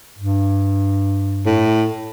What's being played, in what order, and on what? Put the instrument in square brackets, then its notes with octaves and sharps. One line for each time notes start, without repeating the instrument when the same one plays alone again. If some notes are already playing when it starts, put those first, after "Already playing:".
[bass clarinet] G2
[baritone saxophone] A2